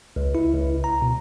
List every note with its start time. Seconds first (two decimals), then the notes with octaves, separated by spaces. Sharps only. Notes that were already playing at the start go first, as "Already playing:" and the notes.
0.16 C#2
0.35 E4
0.53 C#2
0.84 A#5
1.02 B2